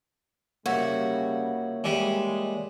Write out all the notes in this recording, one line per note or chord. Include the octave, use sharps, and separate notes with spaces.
C#3 G3 A#3 F#4 C#5 E5
E3 G3 G#3